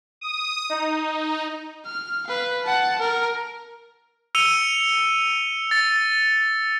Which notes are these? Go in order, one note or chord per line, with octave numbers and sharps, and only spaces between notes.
D#6
D#4
F6
B4 F5
F#5 A5
A#4
E6 C#7 D#7 F7 G7
A6 C#7